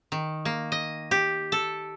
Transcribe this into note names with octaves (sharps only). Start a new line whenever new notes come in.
D#3
A#3
D#5
G4
A4